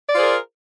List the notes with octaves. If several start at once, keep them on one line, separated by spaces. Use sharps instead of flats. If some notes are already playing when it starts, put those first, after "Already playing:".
F4 G#4 A#4 C5 D5